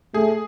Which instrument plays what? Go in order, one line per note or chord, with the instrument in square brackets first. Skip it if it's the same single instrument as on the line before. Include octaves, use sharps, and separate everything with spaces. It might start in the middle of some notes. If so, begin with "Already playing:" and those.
[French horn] A3 [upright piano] G#4